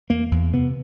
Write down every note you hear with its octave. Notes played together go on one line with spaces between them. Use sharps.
E2 A#3
E2
C3 B3